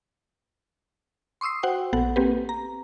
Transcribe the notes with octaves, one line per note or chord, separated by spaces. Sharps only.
C6 C#6 D#6 E6 C7
F#4 C5 F#5 G5
A#1 B3 A4 F#5
A#3 C4 G4 B4
A#5